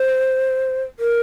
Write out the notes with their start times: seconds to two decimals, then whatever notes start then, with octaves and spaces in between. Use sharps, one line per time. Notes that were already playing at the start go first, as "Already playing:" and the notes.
Already playing: C5
1.00 A#4